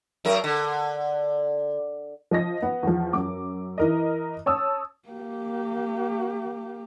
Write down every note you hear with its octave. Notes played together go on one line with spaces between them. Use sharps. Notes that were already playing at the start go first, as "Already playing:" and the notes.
F#2 A#4
D3
F3 D#5 A#6
B3
E2 F3
F#2 D6
E3 A#4 D#5
C#5 A5 D#6 E6
A#3 G4